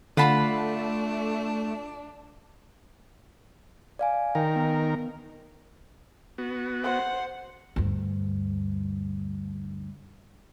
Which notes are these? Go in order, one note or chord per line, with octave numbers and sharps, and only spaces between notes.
D3 A3 D4 F4 F#5 A5 B5
D5 F5 G#5
D#3 A#4 G5
B3
B3 F#4
C5 F#5
D2 G2